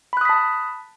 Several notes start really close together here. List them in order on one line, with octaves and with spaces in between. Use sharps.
B5 F#6 D#6 B6 A5